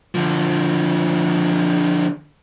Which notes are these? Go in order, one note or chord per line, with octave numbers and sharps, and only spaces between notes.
D3 F3